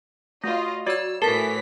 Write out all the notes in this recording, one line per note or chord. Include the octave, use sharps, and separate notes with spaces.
A3 F4 F#4 B4 D#5
F#3 F#4 D5 E6 G#6
A2 E3 A4 A#4 A6 B6